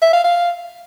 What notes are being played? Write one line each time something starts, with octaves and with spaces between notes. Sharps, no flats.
E5
F5
F5